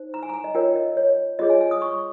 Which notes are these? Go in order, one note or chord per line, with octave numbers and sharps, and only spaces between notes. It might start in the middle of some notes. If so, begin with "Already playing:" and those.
Already playing: D#4 C5
A#5
G#5
A#5
G#5
D#5
F4 A#4 C#5 G5
D#5
C#5
F4 G#4 C#5 D#5
G#5
G#5
D#6
C#6